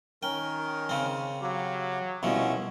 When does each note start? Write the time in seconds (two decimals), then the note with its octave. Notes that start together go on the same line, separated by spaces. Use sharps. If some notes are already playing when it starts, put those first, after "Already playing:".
0.23 D#3 C#4 A#4 G5
0.89 C#3 C4
1.41 F#3 G4 F5
2.23 C2 B2 F3 C#4 F#4 D#5 E5